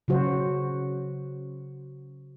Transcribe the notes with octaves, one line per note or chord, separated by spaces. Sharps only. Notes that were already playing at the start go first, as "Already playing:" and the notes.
C#3 F#3 F#4 C5